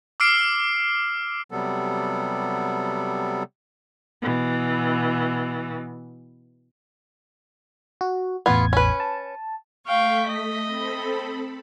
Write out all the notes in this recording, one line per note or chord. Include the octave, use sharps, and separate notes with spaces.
D6 E6 F6 C7 D7
C3 F#3 G3 B3 A4
B2 E3
F#4
A1 E2 B3 F4 G#6
C#4 B4
A5
A3 F5 G5 C#6 B6
D#5
C4 A4 B5